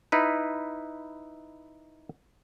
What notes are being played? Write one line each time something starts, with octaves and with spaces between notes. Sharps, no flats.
D#4 E4 B4